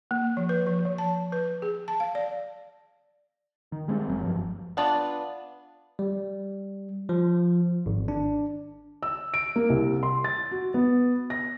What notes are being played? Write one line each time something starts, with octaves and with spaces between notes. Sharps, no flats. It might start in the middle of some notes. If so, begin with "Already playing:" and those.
A#3
F3
B4
F3
F3
A5
B4
G#4
A5
F5
D5
D#3
G3 G#3 C4
F#1 F#3
F#1 G2 F3
B3 D4 F4 D5
G3
F3
G#1
D4
E6
D7
A#3
C2
C6
A6
F#4
B3
A#6